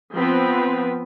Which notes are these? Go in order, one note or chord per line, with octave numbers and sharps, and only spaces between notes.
F3 B3 C4 B4